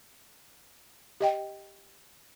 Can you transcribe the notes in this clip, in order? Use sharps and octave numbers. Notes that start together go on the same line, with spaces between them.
G4 D#5 G5